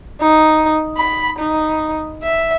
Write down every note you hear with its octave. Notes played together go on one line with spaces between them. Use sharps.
D#4
B5
D#4
E5